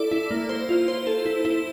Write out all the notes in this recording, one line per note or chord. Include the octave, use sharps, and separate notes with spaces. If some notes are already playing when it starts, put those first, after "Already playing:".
Already playing: E4 A4 D5
E4
A#3
C5
F4
C5
A4
E4
E4